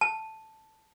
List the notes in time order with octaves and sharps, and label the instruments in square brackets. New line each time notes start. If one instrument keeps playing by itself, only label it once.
[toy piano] A5